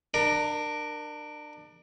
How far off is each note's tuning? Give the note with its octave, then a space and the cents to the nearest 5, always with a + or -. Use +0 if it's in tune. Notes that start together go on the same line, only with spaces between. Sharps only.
D4 +30 A#4 +5